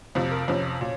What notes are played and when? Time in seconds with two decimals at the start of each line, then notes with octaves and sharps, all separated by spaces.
0.15 F2 C3 F3
0.31 A#4
0.48 F2 C3 F3 C#4
0.81 A#2